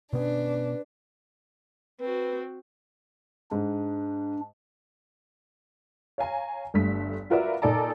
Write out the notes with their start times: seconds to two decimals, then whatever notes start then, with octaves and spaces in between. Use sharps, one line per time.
0.13 B2 B3 C#4 D4 B4
2.00 C4 F#4 B4
3.51 G#2 D4
6.18 C#5 F5 G#5 A#5
6.74 G1 G2 A3 B6
7.30 F4 F#4 A#4 B4 D5 E5
7.62 A#2 D#4 A4 D5 A#5